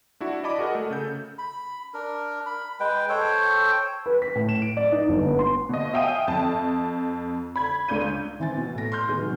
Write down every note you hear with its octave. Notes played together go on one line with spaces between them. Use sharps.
D4 E4 F#4
D5 D#5 A5 B5 D6
F#4 G#4 A#4 D#5 F#5
A3
C#3 A4 G6
B5
D4 A#4
B5
G#3 B4 G5
A4 C5 C#5 G5
B4
B6
A2
E7
D7
D5
D#4
G1
B3
C6
B2 D#5
E5 F5 G5 G#5 D#6 D#7
F2 A5
B5 G#6
C#2 D4 G6 D#7
E3 C4 G#5 A6
B2
A2 A#6
C6 F6 G6
D#3 G#3 B3
C3 F#3